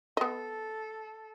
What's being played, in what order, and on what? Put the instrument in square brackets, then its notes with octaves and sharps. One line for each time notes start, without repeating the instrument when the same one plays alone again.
[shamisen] B3 D#5 [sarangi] A4